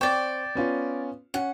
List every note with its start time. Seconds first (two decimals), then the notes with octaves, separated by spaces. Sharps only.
0.01 C4 D5 G5 C#6 E7
0.55 B3 C#4 F4
1.34 C#4 F#5